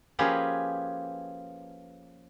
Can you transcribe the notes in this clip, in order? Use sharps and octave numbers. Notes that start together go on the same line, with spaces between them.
F3 A#3 C#4 G4 G#4 B4